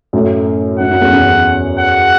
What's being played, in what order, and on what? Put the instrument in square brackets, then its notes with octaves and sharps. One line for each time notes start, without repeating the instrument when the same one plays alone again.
[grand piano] F#2 A2
[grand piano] F#2 [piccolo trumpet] F#5
[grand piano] F#2
E2
F#2
[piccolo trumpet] F#5